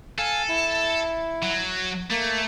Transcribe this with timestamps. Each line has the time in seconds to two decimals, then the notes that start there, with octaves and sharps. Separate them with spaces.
0.18 A4 F5 G#5
0.49 E4
1.43 F#3
2.10 A3 A#3